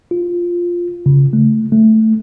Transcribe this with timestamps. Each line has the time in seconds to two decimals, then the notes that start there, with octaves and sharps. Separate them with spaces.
0.11 F4
1.06 C#3
1.33 A3
1.72 A3